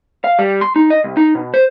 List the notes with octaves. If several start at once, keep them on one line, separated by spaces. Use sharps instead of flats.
F5
G3
C6
D#4
D#5
C2
D#4
B2
C5